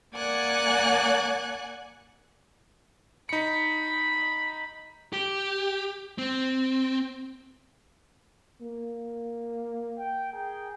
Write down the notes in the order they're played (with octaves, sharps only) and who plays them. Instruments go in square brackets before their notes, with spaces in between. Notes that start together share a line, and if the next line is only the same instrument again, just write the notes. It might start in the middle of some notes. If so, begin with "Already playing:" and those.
[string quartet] A#3 D5 F#5 G#5 F#6 G#6
[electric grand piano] D#4 C#7 [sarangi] B5
[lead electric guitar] G4
C4
[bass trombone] A#3
[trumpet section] G5
G#4 A#4 G5